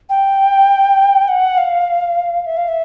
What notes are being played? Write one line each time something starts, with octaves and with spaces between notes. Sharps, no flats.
G5
F#5
F5
E5
F5
E5